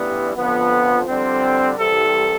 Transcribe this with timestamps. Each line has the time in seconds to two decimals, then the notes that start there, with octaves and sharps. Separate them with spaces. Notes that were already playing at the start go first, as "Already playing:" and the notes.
Already playing: A1 G2 E3 G3 B3
0.35 F2 D3 F3 B3
1.06 F2 D3 G3 C4
1.76 C2 C3 E3 G3 A4